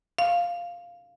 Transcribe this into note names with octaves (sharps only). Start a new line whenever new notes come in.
F5